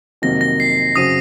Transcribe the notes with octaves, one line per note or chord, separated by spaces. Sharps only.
F2 C3 D#3 F#3 A#3 A#6
A#6
C7
F#2 C#3 F#3 C4 D#6 D#7